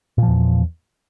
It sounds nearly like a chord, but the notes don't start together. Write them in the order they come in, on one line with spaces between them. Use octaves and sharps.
A#2 F3 E2